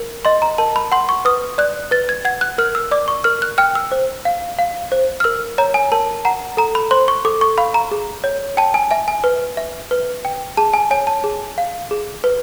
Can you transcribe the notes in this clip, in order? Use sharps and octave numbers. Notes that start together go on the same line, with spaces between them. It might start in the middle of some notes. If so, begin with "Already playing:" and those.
Already playing: A#4
D#5 C6
A#5
A#4 A5
B5
F#5 C6
C#6
B4 D#6
D5 F#6
B4 A6
G#6
F#5 G#6
F#6
A#4 F6
E6
D5 D6
C#6
A#4 F6
F#6
G5 F6
E6
C5
F5
F5
C5
F6
A#4 E6
C#5 A#5
G#5
A#4 A5
F#5 A#5
A4 A#5
B5
C5 C6
C#6
A4 D6
C#6
F5 B5
A#5
G#4
C#5
G5 A5
G#5
E5 G#5
G#5
B4
E5
B4
G5
G#4 A5
G#5
C#5 G#5
A5
G#4
F5
G#4
B4